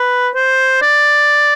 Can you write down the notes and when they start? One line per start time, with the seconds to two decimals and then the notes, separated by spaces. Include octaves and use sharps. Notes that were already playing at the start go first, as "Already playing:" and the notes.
Already playing: B4
0.35 C5
0.82 D5